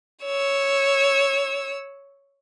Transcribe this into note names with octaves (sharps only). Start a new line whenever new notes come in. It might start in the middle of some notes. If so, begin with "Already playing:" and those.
C#5 E6